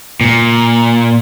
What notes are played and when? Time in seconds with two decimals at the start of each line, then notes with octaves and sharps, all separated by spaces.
0.21 A#2